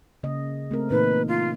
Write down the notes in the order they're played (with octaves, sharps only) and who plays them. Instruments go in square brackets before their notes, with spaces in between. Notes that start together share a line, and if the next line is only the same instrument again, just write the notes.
[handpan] C#3 A#3 D#5
A3 C4 A#4
[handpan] A#2 E3 D#4 [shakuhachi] B4
[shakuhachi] F4